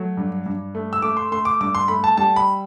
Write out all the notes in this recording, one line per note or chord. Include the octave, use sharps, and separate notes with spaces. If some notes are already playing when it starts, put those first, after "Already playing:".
Already playing: F#3 A3
G2
G2
A3
E6
A3 D6
C6
A3 C6
D6
G2 D6
C6
A3 B5
A5
G3 A5
B5